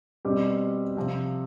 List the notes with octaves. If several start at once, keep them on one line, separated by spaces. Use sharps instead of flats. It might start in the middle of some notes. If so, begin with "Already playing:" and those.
B2 G3 C4 G4
C3 F3 C4